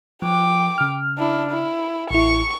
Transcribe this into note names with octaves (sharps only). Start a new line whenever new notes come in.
F3 G5 D6
C#3 F6
D4 E4
E4
A1 E4 C#6